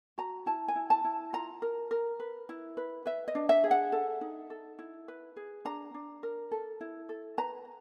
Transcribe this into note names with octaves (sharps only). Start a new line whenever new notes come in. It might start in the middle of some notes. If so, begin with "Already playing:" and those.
F#4 A#5
E4 A5
G#5
E4
A5
E4
F4 A#5
A#4
A#4
B4
E4
B4
B4 E5
D#5
D4
E5
G#4
F#5
A4
D#4
A4
E4
B4
G#4
D4 A#5
D4
A#4
A4
E4
A4
B4 A#5